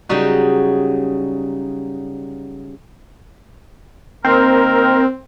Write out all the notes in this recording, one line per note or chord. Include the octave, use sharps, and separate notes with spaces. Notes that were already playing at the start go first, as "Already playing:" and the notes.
C#3 F#3 G3 D#4 F#4
D#3 A#3 C4 A#4